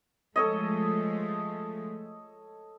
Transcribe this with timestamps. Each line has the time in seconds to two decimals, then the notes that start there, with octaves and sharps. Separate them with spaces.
0.36 F3 G#3 A3 A4 C#5 D#5